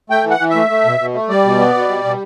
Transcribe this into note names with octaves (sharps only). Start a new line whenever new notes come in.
A3 G5
E3
F#5
E3
E5
A3
A3
B2
B2
A3
G3 D5
B2
B3
B2
G3
B2